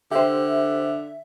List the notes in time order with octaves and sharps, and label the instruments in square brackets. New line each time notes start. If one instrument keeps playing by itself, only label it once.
[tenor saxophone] D3 [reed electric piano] G4 C5 [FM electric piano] E5